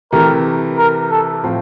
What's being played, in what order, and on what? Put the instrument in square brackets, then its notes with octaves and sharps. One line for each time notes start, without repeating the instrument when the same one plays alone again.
[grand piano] C3 E3 A3 E4 G4 [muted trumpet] A#4
[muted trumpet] A#4
A4
[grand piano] A2 F3 C4 F4